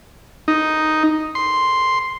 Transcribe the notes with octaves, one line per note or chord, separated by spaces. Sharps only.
D#4
C6